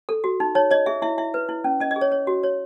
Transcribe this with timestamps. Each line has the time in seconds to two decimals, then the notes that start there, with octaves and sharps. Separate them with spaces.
0.09 A4
0.24 F#4
0.40 D#4
0.55 D#4 C#5
0.71 C#5 D#5
0.86 G#4 E5
1.02 E4 E5
1.18 E4 E5
1.34 B4
1.49 E4
1.64 C#4
1.80 C#4 D#5
1.91 D#5
1.96 G#4
2.01 C#5
2.12 C#5
2.27 F#4
2.43 C#5